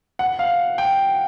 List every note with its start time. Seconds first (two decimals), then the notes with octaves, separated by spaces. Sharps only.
0.19 F#5
0.39 F5
0.78 G5